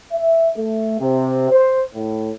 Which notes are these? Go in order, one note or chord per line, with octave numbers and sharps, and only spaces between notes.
E5
A3
C3
C5
A2